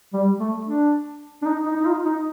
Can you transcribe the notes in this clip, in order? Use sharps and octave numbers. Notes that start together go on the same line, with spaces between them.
G3
A3
D4
D4
D#4
D#4
D#4
F4
D#4